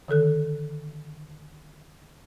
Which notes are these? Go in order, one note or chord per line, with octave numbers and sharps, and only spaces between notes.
D3 D#3 A4 F#6